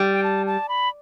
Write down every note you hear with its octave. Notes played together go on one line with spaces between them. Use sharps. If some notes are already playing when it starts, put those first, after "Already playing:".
Already playing: G3
G5
A5
A5
B5